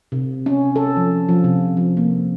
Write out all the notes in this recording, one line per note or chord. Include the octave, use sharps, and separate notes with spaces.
C3
C#4
A4
F3
F3
C3
F3
A#3